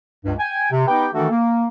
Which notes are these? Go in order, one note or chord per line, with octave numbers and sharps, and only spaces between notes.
C#2 G2
G5 G#5
C3
B3 D#4 G4 B4 G5
D#3 E3 A3 D4 F#4 A4
A#3